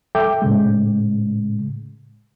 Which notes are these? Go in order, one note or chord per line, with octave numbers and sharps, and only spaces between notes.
A4 E5 G5 D6 G6
A2 C#3 G#3